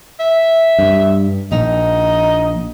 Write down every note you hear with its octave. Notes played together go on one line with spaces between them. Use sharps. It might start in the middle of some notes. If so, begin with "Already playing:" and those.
E5
G2
A#1 D#4